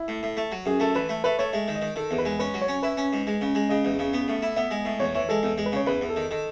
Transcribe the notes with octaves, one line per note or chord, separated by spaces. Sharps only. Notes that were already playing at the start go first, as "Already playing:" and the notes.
Already playing: E4
A2
A2
A3
F#3
F#2 G#4
A3 A4
E3 B4
A3
A3 B4
A3 C#5
G#3 E5
D#3
D#5
D#3
D#3 A4
E2
B4
G#3
C#4 B4
F#3
C#5
C#4
E4 B4
C#4
G#2
G#3
C#3
G#3
C#3 D#5
E2
C#3
B3
A2
E4
B3 E5
G#3
A2
E2 C#5
E3 C#5
G#3 A4
E2 A4
G#3
B4
C#3 C#5
E2 B4
E2
A4
D#3
D#3 A4